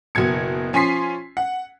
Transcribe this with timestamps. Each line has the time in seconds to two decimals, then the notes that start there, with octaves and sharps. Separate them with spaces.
0.15 F#1 B2 F#3 G#6 C#7
0.73 F3 C#4 G#5 C6 B6 C7
1.37 F#5